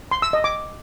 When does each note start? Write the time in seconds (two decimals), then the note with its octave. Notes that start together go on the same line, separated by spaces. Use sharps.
0.11 C6
0.22 E6
0.33 D#5
0.44 D6